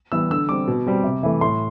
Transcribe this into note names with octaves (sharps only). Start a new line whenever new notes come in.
E3 G3 B3 E6
D3 E6
G3 C4 D6
B2
G3 C4
C3
E3 A3
A2 C6